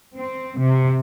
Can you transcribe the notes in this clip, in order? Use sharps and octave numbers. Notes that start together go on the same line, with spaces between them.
C4
C3